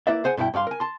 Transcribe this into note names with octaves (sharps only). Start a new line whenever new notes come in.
A#3 E4 B4 D5 E5
G#4 C5 F#5 G#5
G2 B2 E4 A#4 G5
G2 D5 F5 C6
A#4 G#5
A5 C6